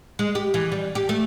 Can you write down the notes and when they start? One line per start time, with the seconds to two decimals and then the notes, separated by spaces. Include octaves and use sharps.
0.19 G#3
0.35 G4
0.54 E3
0.72 G3
0.95 G4
1.09 A3